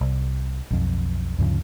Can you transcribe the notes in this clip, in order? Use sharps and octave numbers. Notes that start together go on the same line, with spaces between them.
C2
B1 F2
D2 G2 C#3 F3